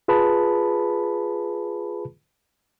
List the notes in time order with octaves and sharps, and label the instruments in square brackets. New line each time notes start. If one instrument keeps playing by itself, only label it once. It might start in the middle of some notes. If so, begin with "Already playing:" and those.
[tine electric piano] F4 G#4 B4 A5 B5